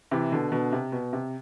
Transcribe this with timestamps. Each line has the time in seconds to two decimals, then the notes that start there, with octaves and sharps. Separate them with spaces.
0.11 C3 E3
0.31 B2 D3
0.52 B2 D3
0.72 C3
0.92 B2
1.13 C3